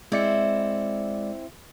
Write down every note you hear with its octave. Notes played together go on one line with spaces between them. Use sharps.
G#3 C4 E4 C5 D5 C#7